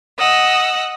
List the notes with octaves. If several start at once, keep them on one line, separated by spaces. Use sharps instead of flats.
D#5 F#5 E6